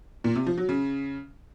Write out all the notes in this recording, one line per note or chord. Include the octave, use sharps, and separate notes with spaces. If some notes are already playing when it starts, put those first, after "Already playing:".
A#2
C3
F3
F#3
C#3